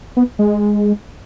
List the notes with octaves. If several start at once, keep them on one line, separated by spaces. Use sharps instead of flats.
B3
G#3